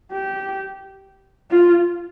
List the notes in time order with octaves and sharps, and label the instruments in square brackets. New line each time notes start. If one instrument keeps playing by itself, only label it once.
[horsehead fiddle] G4
F4